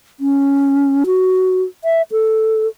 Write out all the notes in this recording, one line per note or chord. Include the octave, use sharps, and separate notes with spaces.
C#4
F#4
E5
A4